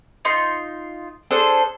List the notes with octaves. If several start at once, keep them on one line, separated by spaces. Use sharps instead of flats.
D#4 F4 C6
D4 G#4 A4 C5